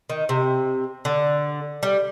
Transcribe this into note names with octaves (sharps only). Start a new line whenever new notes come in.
D#3
C3
D3
G3